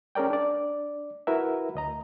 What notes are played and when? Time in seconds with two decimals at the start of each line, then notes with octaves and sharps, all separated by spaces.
0.15 C#4 G#4 A#4 D5 G5
0.30 D4 D5
1.27 E4 F#4 A#4 B4 E5
1.75 D2 D#5 A#5